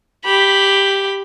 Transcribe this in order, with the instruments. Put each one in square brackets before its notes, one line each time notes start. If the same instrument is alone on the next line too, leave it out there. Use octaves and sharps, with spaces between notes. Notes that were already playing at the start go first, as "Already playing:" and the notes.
[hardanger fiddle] G4 B5